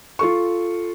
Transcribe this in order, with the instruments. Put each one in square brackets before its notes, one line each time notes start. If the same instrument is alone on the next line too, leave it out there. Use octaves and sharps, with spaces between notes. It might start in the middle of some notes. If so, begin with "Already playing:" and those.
[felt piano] F4 A4 C#6